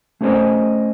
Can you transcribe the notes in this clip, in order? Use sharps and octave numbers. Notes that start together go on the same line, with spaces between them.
A3 C#4 G4 C5 D#5 G#5